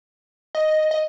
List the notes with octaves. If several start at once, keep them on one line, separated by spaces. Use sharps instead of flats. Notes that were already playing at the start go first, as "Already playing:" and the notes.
D#5
D#5